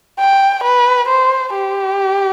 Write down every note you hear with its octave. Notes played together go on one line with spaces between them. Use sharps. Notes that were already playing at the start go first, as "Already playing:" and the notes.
G5
B4
C5
G4